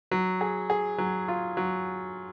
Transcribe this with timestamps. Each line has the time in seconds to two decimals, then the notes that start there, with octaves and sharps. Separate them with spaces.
0.11 F#3
0.41 G#4
0.70 G#4
0.98 F#3
1.28 F4
1.57 F#3